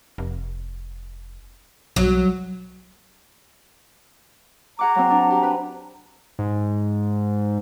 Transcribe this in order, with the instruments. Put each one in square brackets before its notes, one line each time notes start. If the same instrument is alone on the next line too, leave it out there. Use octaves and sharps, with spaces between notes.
[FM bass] F1
[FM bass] B1 [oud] F#3
[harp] G#4 F#5 D6 [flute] A#5
[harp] F#3 C4
D4
G4
B4
[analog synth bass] G#2